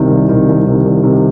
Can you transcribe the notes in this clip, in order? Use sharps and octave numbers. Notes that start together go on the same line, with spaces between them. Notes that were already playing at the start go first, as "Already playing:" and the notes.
Already playing: C2 C3 D#3
C2
C3 D#3
C2
C3 D#3
C2
C3 D#3